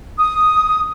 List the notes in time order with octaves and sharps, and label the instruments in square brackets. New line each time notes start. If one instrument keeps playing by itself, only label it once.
[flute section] D#6